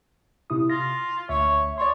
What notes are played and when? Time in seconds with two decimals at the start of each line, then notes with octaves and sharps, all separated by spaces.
0.50 C3 E4 D#6
0.70 F4 A#6
1.29 D2 C#5 E5
1.78 C#5 D5 C6